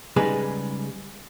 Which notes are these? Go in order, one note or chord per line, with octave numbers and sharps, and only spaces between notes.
C#3 G3 G#3 D#4 G#4 B4